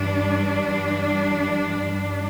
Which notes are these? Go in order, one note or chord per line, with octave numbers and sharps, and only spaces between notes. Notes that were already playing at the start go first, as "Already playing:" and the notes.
Already playing: G2 E3 G3 D4